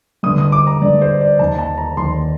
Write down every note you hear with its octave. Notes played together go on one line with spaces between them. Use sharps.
G2 D3 D#6
D#6
D6
A#5
G2 D3 D5
C5
D5
D#2 D#3 A5
A5
A#5
D#2 D#3 C6